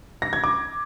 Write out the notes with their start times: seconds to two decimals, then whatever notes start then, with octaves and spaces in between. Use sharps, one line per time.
0.22 A#6
0.33 G#6
0.44 D6